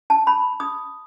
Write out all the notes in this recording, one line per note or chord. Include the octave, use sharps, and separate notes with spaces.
A5
B5
D#6